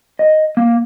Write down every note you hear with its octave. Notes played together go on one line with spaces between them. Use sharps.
D#5
A#3